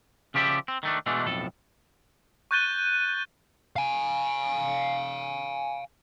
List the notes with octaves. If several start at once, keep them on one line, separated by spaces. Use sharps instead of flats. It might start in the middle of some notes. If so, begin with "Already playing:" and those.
C#3 F3 G4 D5 E5
C4
D#3 A3 D4
B2 E3 G#3 A3 D4
B1 F2 A2 A4
C#6 F#6 G6 A6 D#7 G7
F5 G#5